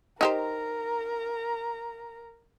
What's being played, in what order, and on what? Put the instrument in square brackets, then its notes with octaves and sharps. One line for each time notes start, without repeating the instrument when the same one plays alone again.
[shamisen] D#4 G4 C5 [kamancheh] A#4 A#5